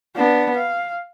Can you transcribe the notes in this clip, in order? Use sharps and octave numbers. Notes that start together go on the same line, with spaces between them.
B3 D4
F5